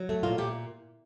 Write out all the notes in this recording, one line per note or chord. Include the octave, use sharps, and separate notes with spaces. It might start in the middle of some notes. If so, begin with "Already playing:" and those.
Already playing: F#3
A3
A#2 F4
A#2 G4